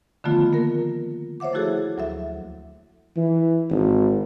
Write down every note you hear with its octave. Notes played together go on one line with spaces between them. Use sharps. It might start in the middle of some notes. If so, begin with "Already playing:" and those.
D3 D#3 F3 A3 B3 F4
A#3 A#4
C5 C#5 E5 F#5 D6
F3 A3 E4 F#4 G#4 A4
D2 F#3 A4 E5
E3
G#1